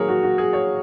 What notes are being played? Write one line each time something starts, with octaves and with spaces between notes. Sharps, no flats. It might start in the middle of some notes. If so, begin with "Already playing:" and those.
Already playing: D#3 F#3 A#3 G#4 A#4 C#5
F#4
F#4
G#4
C#5